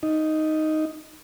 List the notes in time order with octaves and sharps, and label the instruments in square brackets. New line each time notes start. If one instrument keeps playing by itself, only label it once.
[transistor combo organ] D#4